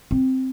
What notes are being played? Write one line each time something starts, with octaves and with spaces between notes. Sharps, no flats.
C4